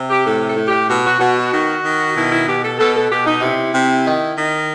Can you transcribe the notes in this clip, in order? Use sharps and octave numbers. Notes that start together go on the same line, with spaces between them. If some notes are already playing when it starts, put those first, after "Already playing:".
Already playing: C3
G4
A2 A4
A4
A2
G4
B2 F#4
F#4
B2 F#4
F#4
D#3
D#3
B2 E4
E4
B2 G4
A4
B2 A4
A4
B2 G4
D#4
C3 E4
C3
D#3
D#3